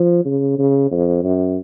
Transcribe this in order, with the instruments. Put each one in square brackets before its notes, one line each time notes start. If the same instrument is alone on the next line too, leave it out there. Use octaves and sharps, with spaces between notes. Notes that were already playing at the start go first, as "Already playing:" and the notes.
Already playing: [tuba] F3
C#3
C#3
F2
F#2